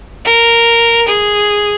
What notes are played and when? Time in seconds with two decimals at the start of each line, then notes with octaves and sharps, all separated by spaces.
0.25 A#4
1.08 G#4